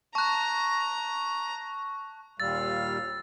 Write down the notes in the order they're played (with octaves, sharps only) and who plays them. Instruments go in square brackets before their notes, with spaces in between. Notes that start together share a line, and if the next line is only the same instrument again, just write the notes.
[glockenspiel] A5 F#6 [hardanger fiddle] A#5 [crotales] C#6
[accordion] D#2 A#2 G3 [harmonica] F5 [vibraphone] E6 [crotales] A6